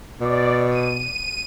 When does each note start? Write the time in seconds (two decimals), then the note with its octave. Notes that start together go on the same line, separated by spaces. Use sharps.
0.21 B2 D5
0.70 D#7